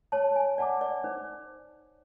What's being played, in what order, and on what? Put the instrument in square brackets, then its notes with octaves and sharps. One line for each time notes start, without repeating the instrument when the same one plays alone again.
[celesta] C#5 [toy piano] A5
[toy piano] G#5
[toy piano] D5 [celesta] F#5 A5 D6
[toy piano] D5
[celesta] D#4 [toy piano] C5